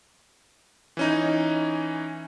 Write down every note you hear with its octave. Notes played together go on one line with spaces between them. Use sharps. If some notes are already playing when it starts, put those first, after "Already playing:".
E3 C#4 D#4